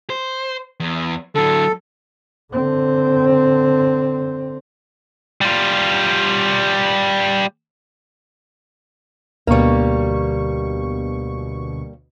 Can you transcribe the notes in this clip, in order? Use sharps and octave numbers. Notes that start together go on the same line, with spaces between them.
C5
E2
D3 F#3 A4
D3 C4
G3 F4
D2 B2 G3 A#3 C#6